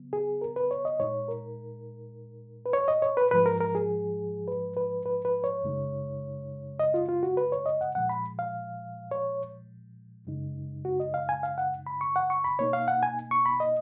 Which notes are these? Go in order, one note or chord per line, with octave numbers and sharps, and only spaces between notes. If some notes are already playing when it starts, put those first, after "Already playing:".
Already playing: C#3 F#3 B3
G#4
A#4
B4
C#5
D#5
A#2 G#3 D#4 C#5
A#4
B4
C#5
D#5
C#5
B4
G#2 F3 G#3 B4
A#4
A#4
G#4
B4
B4
B4
B4
C#5
F#2 C#3 G#3 D#4
D#5
F4
F4
F#4
B4
C#5
D#5
F#5
A#2 F3 G#3 F#5
B5
F5
C#5
F#2 C#3 G#3 D#4
F#4
D#5
F5
G#5
F5
F#5
B5
C#6
F#5
C#6
B5
B2 A#3 D#4 C#5
F5
F#5
G#5
C#6
B5
D#5